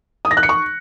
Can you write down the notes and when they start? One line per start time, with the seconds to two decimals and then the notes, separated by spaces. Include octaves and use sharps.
0.25 D#6
0.31 A#6
0.37 F#6
0.43 C#7
0.49 C#6